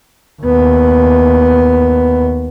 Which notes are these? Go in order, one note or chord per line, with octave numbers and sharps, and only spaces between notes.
D#2 B3